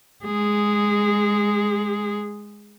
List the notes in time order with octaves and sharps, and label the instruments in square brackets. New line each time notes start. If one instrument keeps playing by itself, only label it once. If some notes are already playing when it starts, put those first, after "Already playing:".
[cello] G#3 G#4